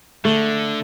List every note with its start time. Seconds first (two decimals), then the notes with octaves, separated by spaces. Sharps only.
0.25 D3 A3